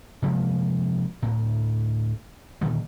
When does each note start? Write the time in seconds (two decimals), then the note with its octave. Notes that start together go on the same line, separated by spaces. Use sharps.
0.22 C3 F3 G#3 A#3
1.22 D2 A2
2.61 A#2 D3 D#3 G3